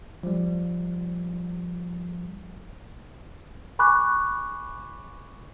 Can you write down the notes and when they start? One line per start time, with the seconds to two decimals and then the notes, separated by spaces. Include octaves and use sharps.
0.23 F3 G3
3.79 G#5 B5 C#6 D6 F#6